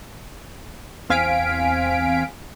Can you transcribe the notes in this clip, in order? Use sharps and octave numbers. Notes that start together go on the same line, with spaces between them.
E2 C4 F5 G#5 B6 D7